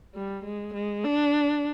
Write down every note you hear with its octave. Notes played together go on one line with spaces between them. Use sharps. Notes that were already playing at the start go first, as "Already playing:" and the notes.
G3
G#3
G#3
D4